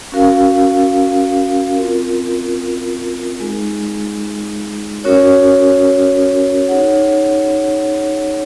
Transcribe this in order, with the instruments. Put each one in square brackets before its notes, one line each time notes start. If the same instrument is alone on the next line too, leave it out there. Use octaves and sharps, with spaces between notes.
[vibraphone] C#4 F#4 A#4 F5
C4 F4 A#4
G#3 D#4 G#4
C#4 F#4 A#4 C#5
D#4 G#4 C#5 F#5